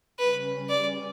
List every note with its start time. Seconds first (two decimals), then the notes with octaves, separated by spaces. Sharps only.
0.18 C#3 G3 C#4 B4
0.69 D5